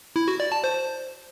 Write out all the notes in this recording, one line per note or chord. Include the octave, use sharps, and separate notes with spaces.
E4
F#4
D5
A5
C5